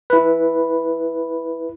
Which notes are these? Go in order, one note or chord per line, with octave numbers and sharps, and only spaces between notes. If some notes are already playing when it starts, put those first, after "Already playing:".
E4 B4